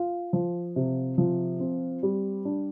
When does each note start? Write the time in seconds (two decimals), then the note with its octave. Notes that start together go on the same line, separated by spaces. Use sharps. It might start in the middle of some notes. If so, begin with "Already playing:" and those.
Already playing: F4
0.33 F3
0.76 C3
1.18 F3
1.60 C4
2.03 G3
2.45 D4